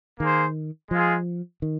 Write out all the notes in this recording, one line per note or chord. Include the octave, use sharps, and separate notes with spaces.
D#3 A#3 G#4 C5
F3 G#3 F4 G#4
D#3